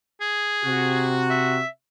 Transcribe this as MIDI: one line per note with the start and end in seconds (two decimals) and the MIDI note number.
0.21 1.15 68
0.64 1.60 48
0.64 1.60 66
1.30 1.68 76